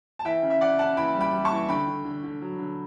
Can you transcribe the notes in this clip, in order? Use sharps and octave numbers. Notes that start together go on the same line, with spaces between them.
A5
E3 E5 G5
C#3
E5
C#3 D5 F#5
C#3 F#5 A5
E3 G5 B5
G3
G5 B5
G3
A5 C#6
E3
D3 G5 B5
D3
D3
D3
F#3
D3